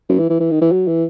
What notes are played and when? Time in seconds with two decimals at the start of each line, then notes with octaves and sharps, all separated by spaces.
0.09 F#2
0.19 E3
0.30 E3
0.40 E3
0.51 D#3
0.61 E3
0.72 F#3
0.88 E3